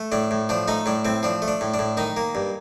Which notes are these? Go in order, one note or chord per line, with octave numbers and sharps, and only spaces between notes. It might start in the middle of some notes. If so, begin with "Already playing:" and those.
Already playing: A3
A2 D4
A2
F3 D4
A3 D#4
A2 D4
A2 C4
F3 D4
A3
D4
A2
D4
A2
D#3 D#4
A#3
G2